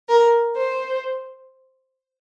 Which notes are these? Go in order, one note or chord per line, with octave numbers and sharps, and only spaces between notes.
A#4
C5